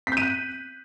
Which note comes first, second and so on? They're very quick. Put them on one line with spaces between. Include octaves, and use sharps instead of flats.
B6 G6 D#7 F#6